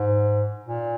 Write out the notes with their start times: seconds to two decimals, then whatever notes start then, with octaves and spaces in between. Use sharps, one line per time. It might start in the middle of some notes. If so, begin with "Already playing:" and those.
Already playing: G#2
0.65 A#2